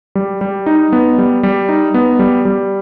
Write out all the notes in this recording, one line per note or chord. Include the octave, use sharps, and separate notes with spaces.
G3
G3
D#4
B3
G3
G3
D#4
B3
G3
G3